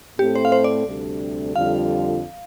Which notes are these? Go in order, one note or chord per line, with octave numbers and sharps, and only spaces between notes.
A2 A3 C4 G4 A4
C5
F5
C5
D5
D2 C3 G3 D4 A4
F2 D3 G3 F4 F5